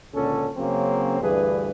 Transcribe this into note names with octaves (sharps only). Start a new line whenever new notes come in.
C#2 A#2 D3 C#4 A4
C#3 F#3 A#3 C4 C#4
D2 G2 E3 G#4 B4